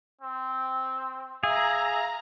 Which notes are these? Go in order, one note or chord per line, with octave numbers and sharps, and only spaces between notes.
C4
G#4 E5 F5 A#5